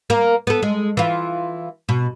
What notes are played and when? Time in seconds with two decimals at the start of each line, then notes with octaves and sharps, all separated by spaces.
0.10 A#3 A#4
0.47 B3 A4
0.62 G#3
0.97 E3 F4
1.89 B2